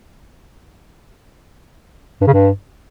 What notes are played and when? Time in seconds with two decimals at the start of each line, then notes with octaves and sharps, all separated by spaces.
2.21 G2
2.27 C#3
2.33 G2